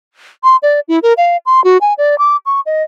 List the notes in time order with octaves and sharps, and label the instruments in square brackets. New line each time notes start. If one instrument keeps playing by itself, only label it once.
[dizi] C6
D5
E4
A#4
F5
C6
F#4
G#5
D5
D6
C#6
D#5